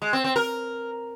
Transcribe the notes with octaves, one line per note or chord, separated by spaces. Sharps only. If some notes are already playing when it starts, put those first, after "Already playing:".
G#3
C4
C4
A#4